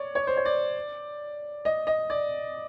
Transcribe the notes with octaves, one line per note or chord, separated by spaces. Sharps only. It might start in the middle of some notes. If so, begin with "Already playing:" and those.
Already playing: C#5 D5
C#5
C5
C#5
D5
D#5
D#5
D5